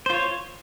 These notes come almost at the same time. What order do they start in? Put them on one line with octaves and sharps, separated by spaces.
C5 F4 C#5